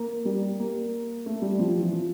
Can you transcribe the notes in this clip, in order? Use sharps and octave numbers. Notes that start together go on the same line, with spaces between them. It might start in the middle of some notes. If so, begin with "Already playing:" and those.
Already playing: A#3
G3
A#3
A3
G3
F3
E3
F3